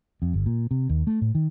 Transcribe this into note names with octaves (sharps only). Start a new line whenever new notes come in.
F2
G1
A#2
C3
D#2
A3
A2
D#3